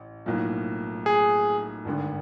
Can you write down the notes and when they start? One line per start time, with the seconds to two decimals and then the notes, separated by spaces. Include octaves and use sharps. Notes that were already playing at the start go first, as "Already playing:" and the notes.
Already playing: A1
0.26 B1 A2 F3 A#3
1.06 G#4
1.85 G#1 G2 D3